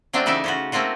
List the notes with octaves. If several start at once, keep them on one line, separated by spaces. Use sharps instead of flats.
F#3 A3 C4 D4 F4
C#3 E3 D#4 A4 D5 E5
C#4 F4 F#4
A3 A#3 C4 F4 F#4